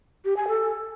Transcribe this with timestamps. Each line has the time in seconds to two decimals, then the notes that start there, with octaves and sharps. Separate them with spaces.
0.25 G4
0.37 G#5
0.48 A4